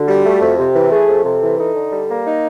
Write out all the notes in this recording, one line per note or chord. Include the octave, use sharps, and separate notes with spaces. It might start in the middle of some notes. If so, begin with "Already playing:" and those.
Already playing: D3 F#4
G3
A3
F2
C3 G4
E3
A3 G#4
F2
C3 A4
E3
D#4 A4
D3
G3
A#3
D#4